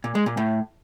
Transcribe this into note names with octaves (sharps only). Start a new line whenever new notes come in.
A#2
G#3
A#2
A2